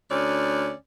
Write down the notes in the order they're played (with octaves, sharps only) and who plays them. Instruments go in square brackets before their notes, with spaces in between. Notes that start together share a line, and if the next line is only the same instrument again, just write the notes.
[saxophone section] D2 C#4 D5